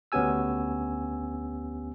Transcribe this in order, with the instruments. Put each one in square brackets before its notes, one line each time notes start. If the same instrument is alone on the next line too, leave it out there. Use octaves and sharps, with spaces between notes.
[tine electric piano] D2 B3 C#4 G4 G#5 E6